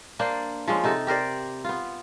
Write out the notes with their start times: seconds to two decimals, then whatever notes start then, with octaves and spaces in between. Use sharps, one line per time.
0.19 A#3 D4 C5 D5
0.68 F3 G#3 C#4
0.84 C3 D#4 A4
1.07 G4 A#4 C5 D5
1.64 B3 F4